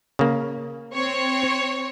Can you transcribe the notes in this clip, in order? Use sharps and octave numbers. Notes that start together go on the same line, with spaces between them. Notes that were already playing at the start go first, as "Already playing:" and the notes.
C#3 A#3
C4 C#5